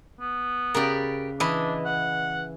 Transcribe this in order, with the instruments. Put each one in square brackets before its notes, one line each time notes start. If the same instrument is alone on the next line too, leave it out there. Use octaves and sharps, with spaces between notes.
[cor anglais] B3
[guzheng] C#3 B4 D5 [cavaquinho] G4 A#4
[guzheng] E3 [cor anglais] D4 [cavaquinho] D#5 B5
[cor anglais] F#5